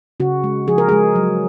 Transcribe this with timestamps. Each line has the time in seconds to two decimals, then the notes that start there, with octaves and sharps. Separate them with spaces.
0.20 C#3 F#4
0.44 G#3
0.68 F3 G#4
0.78 A#4
0.89 G#3 G#4
1.15 F#3